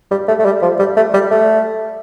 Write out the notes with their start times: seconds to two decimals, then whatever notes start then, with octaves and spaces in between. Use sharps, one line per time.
0.11 G3
0.28 A3
0.39 A3
0.45 G3
0.62 F3
0.79 G3
0.96 A3
1.14 G3
1.31 A3